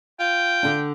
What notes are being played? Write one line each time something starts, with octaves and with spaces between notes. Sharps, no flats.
F4 G5
D3 D4